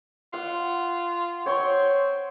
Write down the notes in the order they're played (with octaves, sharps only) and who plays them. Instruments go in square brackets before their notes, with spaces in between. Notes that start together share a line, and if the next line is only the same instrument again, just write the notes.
[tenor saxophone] F4 [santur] F#5
[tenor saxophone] C4 [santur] C#5 C6 C#6